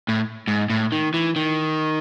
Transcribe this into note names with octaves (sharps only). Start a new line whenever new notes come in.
A2
G#2
A2
D#3
E3
D#3